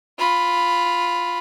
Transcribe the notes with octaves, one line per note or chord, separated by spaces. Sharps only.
F4 B5